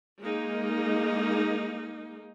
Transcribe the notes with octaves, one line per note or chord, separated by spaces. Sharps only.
G#3 A#3 D#4